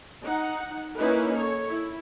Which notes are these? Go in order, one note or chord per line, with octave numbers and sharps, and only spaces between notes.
D#4 F#5
A#3 C#4 D#4 E4 B4
A4 C#5
E4